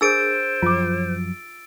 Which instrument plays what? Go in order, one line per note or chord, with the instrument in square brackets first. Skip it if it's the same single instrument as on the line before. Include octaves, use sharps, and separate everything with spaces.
[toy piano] D4 G#4 A#4 [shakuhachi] C5 [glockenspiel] E6 A6 D7
[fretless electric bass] F#2 F3 [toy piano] F4 D6